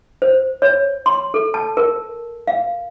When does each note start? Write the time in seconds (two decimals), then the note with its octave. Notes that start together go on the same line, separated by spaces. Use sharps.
0.22 C5
0.62 C#5
1.06 C6
1.34 A4
1.54 A5
1.77 A#4
2.48 F5